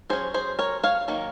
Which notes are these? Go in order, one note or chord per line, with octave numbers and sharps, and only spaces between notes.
F#3 C#4 G#4 C5
G#4 C5
A#4 C#5
C#5 F5
D#3 F#3 A#3